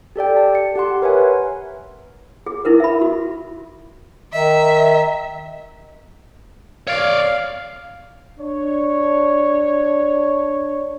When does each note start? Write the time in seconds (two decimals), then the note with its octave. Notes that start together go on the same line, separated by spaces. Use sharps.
0.16 G4 A4 D5 G5
0.37 A5
0.55 C#7
0.75 G4 F#5 C6
1.02 A#4 B4 C#5 E5 F#5 G#5
2.46 G#4
2.65 D#4 E4 A#4 B4
2.80 E5 B5
3.01 F#4
4.33 D#3 D#5 E5
6.87 C#5 D5 F5
8.40 D4 C#5